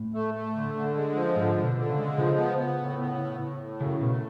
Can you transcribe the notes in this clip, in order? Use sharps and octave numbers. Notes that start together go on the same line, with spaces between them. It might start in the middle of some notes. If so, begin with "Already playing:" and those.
Already playing: A2
A3
A3
D3
D3
G#3
F3
G#2 D3
D3
B2
D3
C#3
G#3
C#3 F3
B3
B3
A2
B3
A2
A2
A2
F#2 C#3
B2 A3